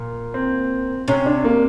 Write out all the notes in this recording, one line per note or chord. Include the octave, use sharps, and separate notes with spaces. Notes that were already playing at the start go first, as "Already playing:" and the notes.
Already playing: A#2
C4
C3 C#4
D4
A#3